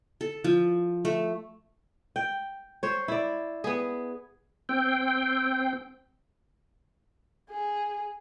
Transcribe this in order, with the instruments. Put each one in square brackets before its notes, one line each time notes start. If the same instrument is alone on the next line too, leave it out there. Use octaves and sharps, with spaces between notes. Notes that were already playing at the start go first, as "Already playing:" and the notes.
[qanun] A4
F3
A3
[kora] G5
C5 C#5
E4 D5
B3 G#4
[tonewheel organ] C4 G5
[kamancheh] G#4